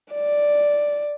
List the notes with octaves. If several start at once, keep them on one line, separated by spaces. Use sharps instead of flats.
D5